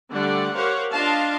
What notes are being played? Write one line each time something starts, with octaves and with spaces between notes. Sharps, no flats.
D3 G3 A3 D5 F#5
G4 A#4 C5 C#5 F5 F#5
D4 F4 D#5 F5 A5